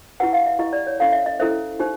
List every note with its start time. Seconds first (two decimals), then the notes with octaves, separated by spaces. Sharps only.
0.20 E4 G4 B4 F#5
0.33 F5
0.46 E5
0.59 E4 G4 B4 D#5
0.73 D5
0.87 C#5
0.99 C#4 E4 A4 C5 F5
1.13 E5
1.26 D#5
1.40 C#4 E4 A4 C5 E5
1.79 D#4 G4 C5